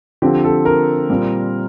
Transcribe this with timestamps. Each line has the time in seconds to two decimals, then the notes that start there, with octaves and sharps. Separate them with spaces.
0.22 D3 F3 C4 G4
0.44 A4
0.65 A#4
1.09 A#2 G3 C4